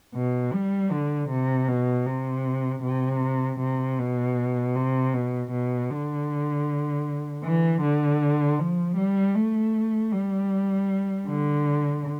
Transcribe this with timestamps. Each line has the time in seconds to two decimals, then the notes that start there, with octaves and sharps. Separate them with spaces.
0.15 B2
0.53 G3
0.91 D3
1.29 C3
1.68 B2
2.06 C3
2.83 C3
3.60 C3
3.99 B2
4.75 C3
5.13 B2
5.51 B2
5.90 D3
7.43 E3
7.82 D3
8.59 F3
8.97 G3
9.35 A3
10.12 G3
11.27 D3